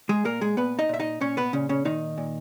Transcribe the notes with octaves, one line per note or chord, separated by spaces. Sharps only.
G#3 G#4
A#2 A#3 A#4
G#3 G#4
A#2 B3 B4
D#4 D#5
A#2 E5
D#4 D#5
A#2 C#4 C#5
B3 B4
A#2 C#3 C#4
C#3 C#4
A#2 D#3 D#4
A#2